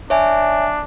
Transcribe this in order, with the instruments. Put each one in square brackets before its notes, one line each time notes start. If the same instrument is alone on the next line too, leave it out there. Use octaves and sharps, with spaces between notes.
[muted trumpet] D4 [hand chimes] C#5 E5 G#5